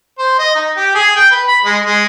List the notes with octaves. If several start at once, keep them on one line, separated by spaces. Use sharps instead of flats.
C5
D#5
D#4
G4
G#4
G5
B4
B5
G#3
G#3